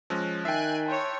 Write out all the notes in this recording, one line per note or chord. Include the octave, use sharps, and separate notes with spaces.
F3 G#3 C#4 E6 F#6 A#6
D#3 E5 G5 G#5 F#6 A6 C7
E4 C#5 A5 C6 G6